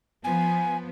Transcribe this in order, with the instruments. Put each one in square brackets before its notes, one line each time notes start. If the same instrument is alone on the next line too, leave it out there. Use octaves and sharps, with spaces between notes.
[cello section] F3 B3 [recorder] G#5